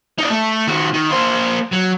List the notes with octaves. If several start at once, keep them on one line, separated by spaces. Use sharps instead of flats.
D#4 D5
A3
D#3 F#4
D#3
A#3 C5
F#3